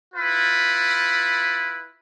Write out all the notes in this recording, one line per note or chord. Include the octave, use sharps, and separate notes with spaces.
E4 F4 B4